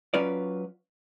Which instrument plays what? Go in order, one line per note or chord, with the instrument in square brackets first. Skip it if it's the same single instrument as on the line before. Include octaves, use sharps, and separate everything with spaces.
[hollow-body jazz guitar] F#3 C#4 F4 B4 D5